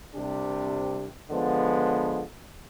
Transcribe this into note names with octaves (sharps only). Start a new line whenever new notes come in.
C2 C3 G3 D4 G4
D3 F3 G#3 B3